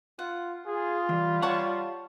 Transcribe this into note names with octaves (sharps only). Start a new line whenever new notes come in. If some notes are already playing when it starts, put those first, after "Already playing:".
F4 F#5
F4 G#4
E3 G3
C#5 F#5 A5 C#6